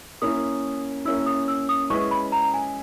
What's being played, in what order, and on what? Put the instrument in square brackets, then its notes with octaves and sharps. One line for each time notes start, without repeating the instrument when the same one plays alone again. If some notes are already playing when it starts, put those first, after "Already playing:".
[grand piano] A#3 C#4 E4 [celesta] D#6
[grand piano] A#3 C#4 E4 [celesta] E6
[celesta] D#6
E6
D#6
[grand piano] G#3 C#4 E4 G#4 B4 [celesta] C#6
[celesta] B5
A#5
G#5